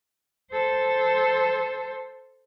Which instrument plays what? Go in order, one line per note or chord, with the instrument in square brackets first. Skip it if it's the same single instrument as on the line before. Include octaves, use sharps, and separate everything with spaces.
[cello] A4 C5